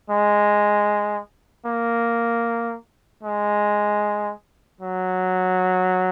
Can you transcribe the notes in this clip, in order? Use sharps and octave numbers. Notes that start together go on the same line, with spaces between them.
G#3
A#3
G#3
F#3